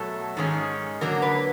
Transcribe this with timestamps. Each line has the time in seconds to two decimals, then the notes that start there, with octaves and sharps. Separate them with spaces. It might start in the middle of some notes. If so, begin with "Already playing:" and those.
Already playing: B2 F#3 A3 A4
0.37 G#2 D#3 G#3 C#4
1.01 D3 F#3 A#3 D4 A#4
1.22 B4